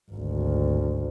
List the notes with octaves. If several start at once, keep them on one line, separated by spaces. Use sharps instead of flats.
G#1 D2